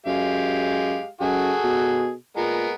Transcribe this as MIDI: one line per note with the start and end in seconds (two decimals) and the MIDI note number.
0.06 0.97 42
0.06 1.08 56
0.06 1.08 67
0.06 1.08 77
1.21 1.52 42
1.21 2.11 66
1.21 2.11 68
1.21 2.11 69
1.64 2.13 47
2.37 2.67 46
2.37 2.73 56
2.37 2.73 59
2.37 2.73 70